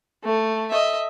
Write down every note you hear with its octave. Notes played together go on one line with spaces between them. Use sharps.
A3
D#5 E5